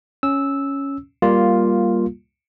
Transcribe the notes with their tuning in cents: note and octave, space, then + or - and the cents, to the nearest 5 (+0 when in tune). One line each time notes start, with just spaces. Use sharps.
C#4 +0 E6 -10
G3 +0 A#3 +5 F4 +0